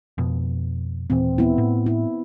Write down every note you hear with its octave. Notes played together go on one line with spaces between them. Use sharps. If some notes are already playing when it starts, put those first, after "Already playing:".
F2 B2
D#1 A#2 E3 C4
B3 E4
A2
E4